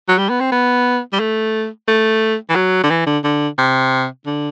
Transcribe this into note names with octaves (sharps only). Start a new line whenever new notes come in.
F#3
G3
B3
C4
B3
G3
A3
A3
E3
F#3
D3
E3
D3
D3
C3
D3